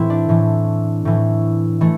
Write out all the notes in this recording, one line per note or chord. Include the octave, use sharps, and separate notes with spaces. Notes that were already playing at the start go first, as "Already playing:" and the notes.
Already playing: A2 E3 C4 E4
D4
A2 E3
A2 E3
E3 A3